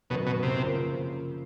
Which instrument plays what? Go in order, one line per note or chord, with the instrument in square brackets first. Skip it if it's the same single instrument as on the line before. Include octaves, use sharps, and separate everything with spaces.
[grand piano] F#2 D#3 F#3 B3 [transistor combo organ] B2
[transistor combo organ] B2
C3
[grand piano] C#3 F3 A#3 C#4